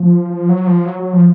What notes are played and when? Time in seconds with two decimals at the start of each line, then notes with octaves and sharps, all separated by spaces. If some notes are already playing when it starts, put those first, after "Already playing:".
Already playing: F3
0.30 F3
0.49 F#3
0.67 F3
0.85 F#3
0.99 F#3
1.13 F3